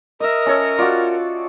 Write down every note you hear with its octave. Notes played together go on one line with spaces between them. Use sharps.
A#4 D#5 E5
C#4 A4 C#5
F4 F#4 D5